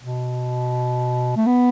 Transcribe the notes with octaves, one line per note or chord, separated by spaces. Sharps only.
B2
A3
B3